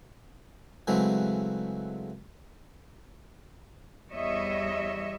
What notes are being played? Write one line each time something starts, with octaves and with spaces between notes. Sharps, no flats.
C#3 E3 F#3 G#3 A3 C4
E2 G3 C#5 D#5 E5